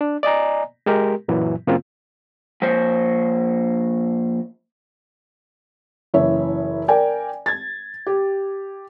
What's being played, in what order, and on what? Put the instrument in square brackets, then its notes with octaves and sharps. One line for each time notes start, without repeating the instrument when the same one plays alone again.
[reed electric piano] D4
D5 D#5 G#5 A#5
G#3 G4 A#4
F#2 A#2 E3 F#3
F#2 C#3 A#3 C4 F4
[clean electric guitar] F3 A#3 C5 C#5
[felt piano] F#1 E3 C#5 E5
A#4 D5 G5 G#5
G#6 A6
G4